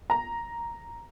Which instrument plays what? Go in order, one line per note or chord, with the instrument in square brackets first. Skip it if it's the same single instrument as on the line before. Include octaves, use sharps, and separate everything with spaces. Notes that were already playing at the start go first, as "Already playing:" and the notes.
[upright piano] A#5